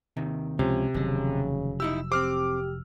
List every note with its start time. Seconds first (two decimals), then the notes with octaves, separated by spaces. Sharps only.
0.17 D#2 C3 D#3
0.59 C#2 C3 F3 C#4
0.94 F1 D#2 C#3 F#3
1.80 D#4 E4 G4 E6
2.12 C4 G4 C5 D6 F6